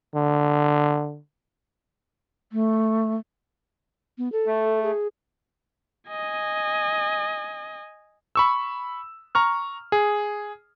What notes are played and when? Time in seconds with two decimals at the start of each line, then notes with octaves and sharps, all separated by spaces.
0.15 D3
2.52 A3
4.18 B3
4.32 A4
4.47 A3
4.83 G#4
6.09 D#5 G#5
8.35 B5 C#6 E6
9.35 A#5 C#6 F6
9.92 G#4